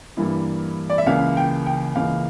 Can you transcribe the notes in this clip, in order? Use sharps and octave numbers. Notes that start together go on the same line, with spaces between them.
G2 E3 G3 A#3 E4
D5
E5
C#2 C#3 E3 A#3 F5
G5
G5
C#2 C#3 E3 A#3 F5